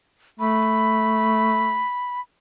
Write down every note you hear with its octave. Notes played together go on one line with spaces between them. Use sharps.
A3 B5